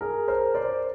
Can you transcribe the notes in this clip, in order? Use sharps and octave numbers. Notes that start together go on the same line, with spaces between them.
G#4 A#4
A#4 C5
C5 D5